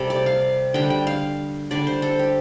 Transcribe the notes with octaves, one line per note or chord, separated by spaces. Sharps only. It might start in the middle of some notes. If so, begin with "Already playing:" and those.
Already playing: C3 G3 G4 A4
D5
F5
D3 G3 G5
G5
F5
D3 G3 D5
C5
A4
G4